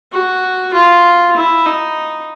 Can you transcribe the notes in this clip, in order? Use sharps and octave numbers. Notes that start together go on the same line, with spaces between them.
F#4
F4
E4
D#4